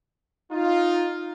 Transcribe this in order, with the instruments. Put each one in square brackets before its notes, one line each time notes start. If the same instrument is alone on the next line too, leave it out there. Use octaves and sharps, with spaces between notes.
[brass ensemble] D#4 F4